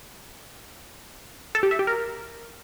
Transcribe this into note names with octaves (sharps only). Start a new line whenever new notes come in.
A4
G4
E5
G4
A#4